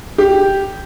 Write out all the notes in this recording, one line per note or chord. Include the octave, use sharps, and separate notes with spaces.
G4